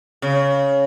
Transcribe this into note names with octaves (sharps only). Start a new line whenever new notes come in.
C#3